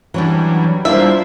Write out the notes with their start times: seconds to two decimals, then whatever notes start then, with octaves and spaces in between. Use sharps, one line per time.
0.14 E3 F#3 G3 C#4 D4
0.85 G3 A#3 D4 E4 F4 C5 E5